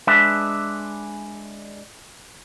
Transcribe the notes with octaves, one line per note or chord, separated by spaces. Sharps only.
G#3 D4 B4 E5